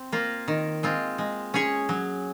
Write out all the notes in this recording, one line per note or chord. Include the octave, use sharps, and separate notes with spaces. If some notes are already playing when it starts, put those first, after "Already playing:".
Already playing: C4
A#3 F4
D#3
G#3 C4 F4
G#3
C#4 G#4 C#5
F#3